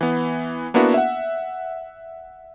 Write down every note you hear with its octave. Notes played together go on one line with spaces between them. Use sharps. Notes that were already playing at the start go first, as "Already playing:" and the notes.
E3 B3
A#3 B3 D4 E4 F#4
E5 F#5